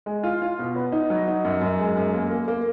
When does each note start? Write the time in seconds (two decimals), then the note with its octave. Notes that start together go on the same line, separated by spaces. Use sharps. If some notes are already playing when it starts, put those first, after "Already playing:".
0.06 G#3
0.23 F4
0.42 F4
0.59 B2
0.76 B3
0.92 D#4
1.10 F#3
1.28 D#4
1.45 F#2
1.61 F#2
1.80 G#3
1.97 F#2
2.13 A#3
2.30 A#3
2.48 A#3